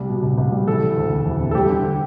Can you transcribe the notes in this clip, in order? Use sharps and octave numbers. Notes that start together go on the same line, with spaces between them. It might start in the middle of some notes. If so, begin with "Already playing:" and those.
Already playing: C2 G3
B2
C2
C2
G3
E3 A4
C3
D2
E1
E3
C3
A4
G3 G4
D3